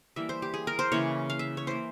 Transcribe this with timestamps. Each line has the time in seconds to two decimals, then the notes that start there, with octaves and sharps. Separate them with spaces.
0.16 E3 G3 A#3 E5
0.29 C5
0.42 G4
0.54 G#4
0.67 A#4
0.79 C5
0.92 C#3 E3 A#3 C#5
1.30 F5
1.39 E5
1.57 C#5
1.67 E3 A#3 C5